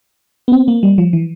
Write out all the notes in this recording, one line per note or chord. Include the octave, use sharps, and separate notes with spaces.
B3
C4
A#3
G3
F3
E3